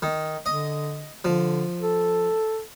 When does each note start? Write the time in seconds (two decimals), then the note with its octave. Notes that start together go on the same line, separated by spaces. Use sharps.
0.02 D#3
0.46 D3 D#5
1.24 D3 F3
1.82 A4